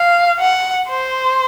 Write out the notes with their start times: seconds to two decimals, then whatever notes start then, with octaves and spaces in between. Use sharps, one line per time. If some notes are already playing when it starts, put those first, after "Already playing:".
Already playing: F5
0.40 F#5
0.88 C5